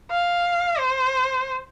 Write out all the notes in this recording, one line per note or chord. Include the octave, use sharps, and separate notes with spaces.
F5
C5